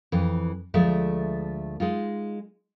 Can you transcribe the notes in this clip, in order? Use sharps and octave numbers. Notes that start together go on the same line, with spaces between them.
F2 E3
D2 F3 G#3 A3 E5
G#3 D#4 F4